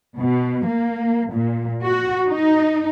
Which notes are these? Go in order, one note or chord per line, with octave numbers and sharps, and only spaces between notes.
B2
A#3
A#2
F#4
D#4